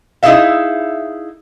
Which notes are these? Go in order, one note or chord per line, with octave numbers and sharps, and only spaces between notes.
D#4 E4 G#4 C#5 E5 F5